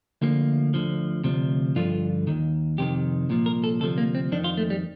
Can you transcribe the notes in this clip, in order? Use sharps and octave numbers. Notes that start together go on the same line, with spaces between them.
D2 D3 F3 A#3
D2 D3 F3
D2 C3 F3
G2 D3 F3 F4
D#2 D#3
F2 C3 D#3 G4
C2 A#2 F3
A#4
A4
D2 C3 F3 A4
A#3
C4
F2 D#3 D4
F4
A3
G3